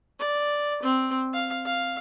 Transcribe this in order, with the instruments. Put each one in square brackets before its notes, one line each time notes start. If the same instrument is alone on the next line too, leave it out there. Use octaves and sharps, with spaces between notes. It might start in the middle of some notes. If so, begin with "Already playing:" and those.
[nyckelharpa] D5
C4
F5
F5